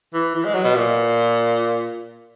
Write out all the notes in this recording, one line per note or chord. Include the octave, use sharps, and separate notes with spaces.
E3
E3
G#3
F#3
B2
A#2